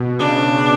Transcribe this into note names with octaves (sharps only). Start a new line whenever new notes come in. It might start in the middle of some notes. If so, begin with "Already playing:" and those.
Already playing: B2
C#3 D4